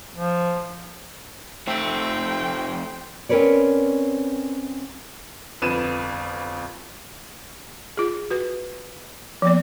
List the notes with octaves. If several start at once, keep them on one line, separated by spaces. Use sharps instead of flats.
F3
F2 A3 C4 G5
C4 C#4 A#4 B4 C#5 D5
G1 F2 B4 D#7 E7
F4 G#4
F#4 B4
F3 A#3 B3 D5